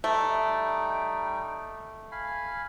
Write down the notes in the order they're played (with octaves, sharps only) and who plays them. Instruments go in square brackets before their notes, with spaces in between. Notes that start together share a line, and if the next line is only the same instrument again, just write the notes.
[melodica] G3 D#4 G5 [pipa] A3
[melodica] F5 G#5 B5